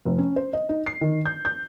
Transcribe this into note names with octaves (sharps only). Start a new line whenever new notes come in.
F1
C#4
C5
D#5
D#4
C7
D#3
G6
G6